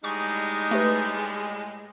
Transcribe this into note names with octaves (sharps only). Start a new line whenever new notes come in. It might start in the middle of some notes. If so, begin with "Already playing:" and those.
A2 G3 G#3 D#4 C#6
A3 G4 B4